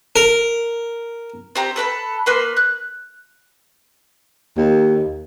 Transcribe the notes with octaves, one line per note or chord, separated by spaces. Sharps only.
A#4
C4 G4 A#5
A4 B4 A#5 B5
A#3 B4 C6
F#6
D#2